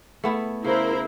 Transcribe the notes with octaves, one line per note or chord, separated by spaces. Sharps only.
A3 B3 E4
C#3 E4 A#4 C5